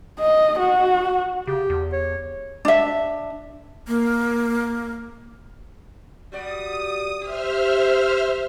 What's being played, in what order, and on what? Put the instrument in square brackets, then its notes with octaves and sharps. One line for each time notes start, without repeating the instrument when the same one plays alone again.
[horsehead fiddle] D#5
F#4
[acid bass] C#3 [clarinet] G4
[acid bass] E2
[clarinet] C#5
[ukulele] D4 E5
[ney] A#3
[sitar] G3 F#4 D5 [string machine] D#6
[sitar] G4 [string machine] C5 E5 F6